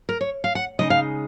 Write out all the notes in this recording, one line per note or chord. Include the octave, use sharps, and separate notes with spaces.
A#4
C#5
F5
F#5
C#3 G#3 D#4 D#5
F5